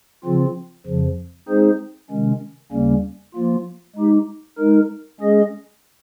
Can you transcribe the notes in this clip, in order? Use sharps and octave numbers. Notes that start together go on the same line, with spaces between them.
C#3 F3 C4 F4
F2 C#3 F3
G#3 C4 D#4 G#4 C5
C3 D#3 G#3 C#4
D#2 C#3 G3 A#3 C#4
F3 A#3 F4
G#3 D#4 G4
G#3 D#4 A#4
G#3 C#4 G#4 D#5